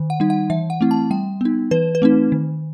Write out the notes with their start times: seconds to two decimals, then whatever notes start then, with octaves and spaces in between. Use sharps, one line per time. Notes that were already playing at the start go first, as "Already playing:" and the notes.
Already playing: D#3
0.10 F#5
0.20 G3 D#4
0.30 F#5
0.50 E3 E5
0.70 F#5
0.81 A3 C4 E4
0.91 A5
1.11 G3 G5
1.41 B3 D#4
1.71 E3 B4
1.95 B4
2.02 A3 C4 D#4
2.32 D#3